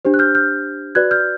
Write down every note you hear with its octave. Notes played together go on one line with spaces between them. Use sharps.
D4 G4 C5
F#6
F6 G6
F6 G6
F#4 B4 D5 F#6 G#6
F6 G6